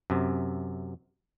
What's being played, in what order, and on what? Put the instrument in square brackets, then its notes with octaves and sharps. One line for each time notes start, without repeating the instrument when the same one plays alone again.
[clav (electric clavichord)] F#2 C3